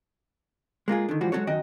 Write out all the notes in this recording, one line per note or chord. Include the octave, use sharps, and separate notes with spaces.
G#3 A#3 F4 G#4
D3 D#3
G#2 E3 F3 G3 F#4
F#3 G#3 B3 F#4 A4 C#5
F#2 D#3 F#4 D#5 G5